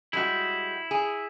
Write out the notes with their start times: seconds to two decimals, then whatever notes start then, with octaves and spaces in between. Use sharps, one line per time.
0.13 G3 G#3 E4 F#4
0.91 G#4